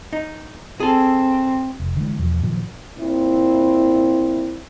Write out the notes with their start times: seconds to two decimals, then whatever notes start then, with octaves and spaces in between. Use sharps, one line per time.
0.13 D#4
0.80 C4 G#4 A4
1.80 F1
1.96 D3 E3 F#3 G#3
2.18 E2 B2 F3
2.42 A#2 D#3 F3 F#3
2.99 A#2 C4 E4